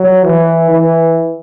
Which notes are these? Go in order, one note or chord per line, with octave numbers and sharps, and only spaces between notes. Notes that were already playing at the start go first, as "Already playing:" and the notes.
Already playing: F#3
E3
E3